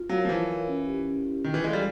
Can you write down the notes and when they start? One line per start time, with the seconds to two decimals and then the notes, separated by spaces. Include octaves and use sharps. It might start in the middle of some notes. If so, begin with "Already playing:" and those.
Already playing: F4
0.09 F#3 A#4 C#5 F5
0.25 F3
0.29 E3 F4
0.48 A#4 C#5 F5
0.68 C#4
0.86 E4 G4
1.06 C#4
1.26 E4 G4
1.44 D#3 F4
1.54 E3
1.64 G#3 A4 D5 F5
1.73 G3